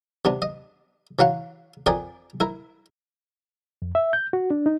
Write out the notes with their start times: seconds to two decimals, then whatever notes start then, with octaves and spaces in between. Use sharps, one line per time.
0.25 C3 B3 D4
0.42 D#5
1.19 E3 F#3 F5 F#5
1.86 F2 A#4 D5 G5 G#5 D#6
2.40 E4 A#4
3.82 F2
3.95 E5
4.13 G6
4.33 F#4
4.50 D4
4.66 D#4